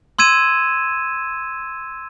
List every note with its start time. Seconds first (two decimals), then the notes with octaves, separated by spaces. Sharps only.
0.19 C6 E6 G#6 D#7 E7